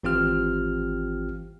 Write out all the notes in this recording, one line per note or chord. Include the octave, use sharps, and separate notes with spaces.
G#1 E3 C4 F4 G4 F6